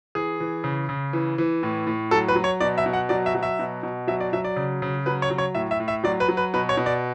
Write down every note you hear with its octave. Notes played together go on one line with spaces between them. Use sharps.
E3 G#4
E3
C#3
C#3
E3
E3
A2
A2
F#3 A4
B4
F#3
C#5
B2 D5
E5
B2
F#5
F#3 D5
E5
F#3
E5
B2
B2
F#3 E5
D5
F#3 E5
D5
C#3
C#3
F#3 B4
C#5
F#3
C#5
A2 E5
E5
A2
E5
F#3 D5
B4
F#3
B4
B2 B4
C#5
B2
D5